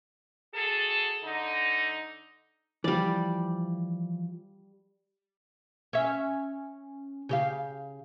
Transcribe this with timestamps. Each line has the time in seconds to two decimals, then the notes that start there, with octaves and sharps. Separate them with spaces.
0.54 F#4 G#4 A4
1.23 D3 D#4
2.84 E3 F3 G3 D5
5.93 C#4 E5
7.29 C#3 G4 F5